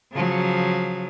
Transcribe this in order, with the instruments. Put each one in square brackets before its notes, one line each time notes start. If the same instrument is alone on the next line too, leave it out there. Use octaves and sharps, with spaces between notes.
[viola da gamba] C#3 F3 F#3